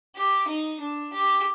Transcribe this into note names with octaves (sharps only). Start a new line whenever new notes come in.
G4
D#4
D4
G4